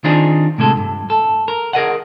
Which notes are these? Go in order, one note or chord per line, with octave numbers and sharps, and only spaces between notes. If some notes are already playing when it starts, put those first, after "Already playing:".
D#3 C4 D4 D#4 F4 G#4
A2 C3 G#3 A4
G2
A4
A#4
G#4 A#4 D#5 F#5